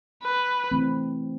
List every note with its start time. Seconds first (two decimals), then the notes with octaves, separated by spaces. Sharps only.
0.23 B4
0.71 E3 A3 C4